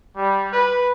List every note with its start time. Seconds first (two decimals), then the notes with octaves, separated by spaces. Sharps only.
0.15 G3
0.53 B4